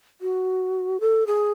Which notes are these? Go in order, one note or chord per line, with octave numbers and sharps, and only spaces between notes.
F#4
A4
G#4